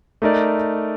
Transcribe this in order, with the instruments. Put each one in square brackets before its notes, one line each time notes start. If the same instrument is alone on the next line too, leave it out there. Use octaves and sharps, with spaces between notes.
[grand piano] A3 D#4 A#4 D5